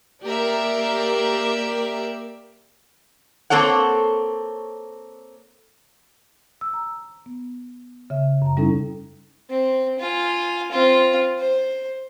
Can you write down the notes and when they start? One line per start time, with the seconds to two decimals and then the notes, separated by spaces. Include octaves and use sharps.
0.24 A#3 G4 A#4 D5 E5
3.50 A#3 C4 A4 C#5 F#5
6.61 E6
6.74 A#5
7.26 B3
8.10 C#3 E5
8.42 F#2 A#5
8.57 G3 C#4 D#4 E4 A4
9.49 C4
9.99 F4 G#5
10.71 C4 F4
11.38 C5